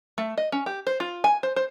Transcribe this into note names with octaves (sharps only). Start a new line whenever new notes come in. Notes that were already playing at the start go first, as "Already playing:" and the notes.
A3
D#5
C#4
G4
C5
F4
G#5
C5
C5